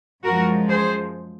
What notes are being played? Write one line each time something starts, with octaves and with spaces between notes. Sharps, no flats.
F#2 F3 G#3 F#4 A#4
G#4 C5